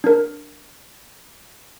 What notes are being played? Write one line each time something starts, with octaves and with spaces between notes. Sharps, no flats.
D4 A#4